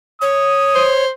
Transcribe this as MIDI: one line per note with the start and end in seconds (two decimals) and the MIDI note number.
0.22 1.04 73
0.22 0.89 87
0.75 1.10 72